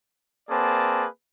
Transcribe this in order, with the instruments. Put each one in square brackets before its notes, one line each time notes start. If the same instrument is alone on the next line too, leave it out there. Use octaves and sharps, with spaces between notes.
[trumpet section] A#3 C4 G#4 B4 D5 A5